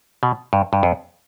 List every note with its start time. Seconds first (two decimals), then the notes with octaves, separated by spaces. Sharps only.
0.23 B2
0.53 G2
0.73 G2
0.83 F2